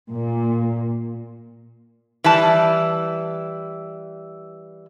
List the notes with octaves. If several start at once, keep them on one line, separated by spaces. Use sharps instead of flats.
A#2
E3 G3 A5